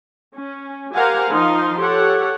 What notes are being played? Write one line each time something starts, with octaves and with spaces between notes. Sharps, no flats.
C#4
G4 A#4 C5 F5 F#5 G#5
F3 D#4 F5 C6
G4 A4 C#5 F#5